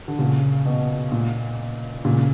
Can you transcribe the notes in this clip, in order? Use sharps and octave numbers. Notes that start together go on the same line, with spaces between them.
D3
A#2 C#3
B2
A#2
A#2 C#3